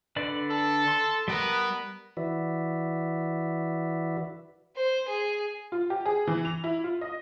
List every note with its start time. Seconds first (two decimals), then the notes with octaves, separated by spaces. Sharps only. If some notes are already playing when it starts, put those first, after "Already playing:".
0.16 D3 B4 D5
0.50 A4
0.88 C6
1.28 G3 B3 A#4
2.17 E3 F#4 B4 D5 E5
4.76 C5
5.08 G#4
5.72 F4
5.90 G4
6.05 G#4
6.27 E3
6.45 F7
6.64 E4
6.84 F4
7.01 D#5